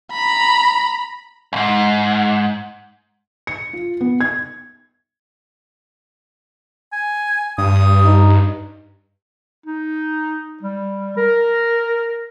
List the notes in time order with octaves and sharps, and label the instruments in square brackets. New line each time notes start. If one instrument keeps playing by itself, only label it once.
[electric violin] A#5 B5
[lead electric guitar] C2 G#2
[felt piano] C#7
F4
B3
G#6
[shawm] G#5
[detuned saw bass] G2 [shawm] D#6
[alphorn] D#4
[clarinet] D#4
G3
A#4